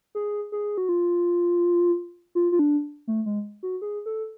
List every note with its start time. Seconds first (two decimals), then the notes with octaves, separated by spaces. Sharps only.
0.15 G#4
0.52 G#4
0.78 F#4
0.89 F4
2.35 F4
2.52 F4
2.59 D4
3.08 A3
3.26 G#3
3.63 F#4
3.82 G#4
4.06 A4